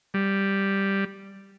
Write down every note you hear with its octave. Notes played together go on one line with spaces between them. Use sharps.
G3